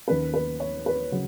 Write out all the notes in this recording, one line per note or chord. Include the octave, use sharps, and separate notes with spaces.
D#2 D#3 A#3 C#4 B4
B4
C#5
B4
C#3 F#3